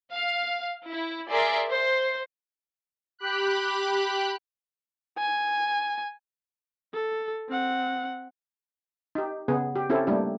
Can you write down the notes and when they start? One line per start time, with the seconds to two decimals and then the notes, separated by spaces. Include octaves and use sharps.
0.10 F5
0.86 E4
1.29 G#4 A#4 D5 E5 C6
1.69 C5
3.19 G4 B5 F#6
5.18 G#5
6.94 A4
7.49 C4 F#5
9.15 D#4 G4
9.48 C#3 B3 G#4
9.76 G4
9.90 C4 C#4 E4 G4 A4
10.07 G3 A3 A#3 D4 E4 G4